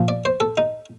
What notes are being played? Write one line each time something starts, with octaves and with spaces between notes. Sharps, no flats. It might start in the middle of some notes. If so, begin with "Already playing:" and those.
Already playing: A#2 F3
D5
C5
A4
D#4